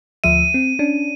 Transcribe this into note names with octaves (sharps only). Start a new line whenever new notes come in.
D2 F3 E5 D#7
C4
C#4 D4